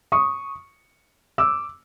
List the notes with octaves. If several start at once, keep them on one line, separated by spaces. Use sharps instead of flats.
C#6 D#6
D6 E6